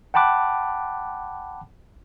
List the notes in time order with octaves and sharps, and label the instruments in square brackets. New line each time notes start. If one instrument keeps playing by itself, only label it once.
[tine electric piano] F#5 G5 A5 B5 D6 F#6